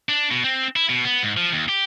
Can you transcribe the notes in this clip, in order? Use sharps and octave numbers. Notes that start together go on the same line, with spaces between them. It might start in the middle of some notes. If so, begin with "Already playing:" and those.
D4
B2
C4
E4
B2
B3
G#2
F3
D#2
G4